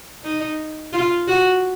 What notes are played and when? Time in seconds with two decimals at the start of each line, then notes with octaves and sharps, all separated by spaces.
0.24 D#4
0.93 F4
1.28 F#4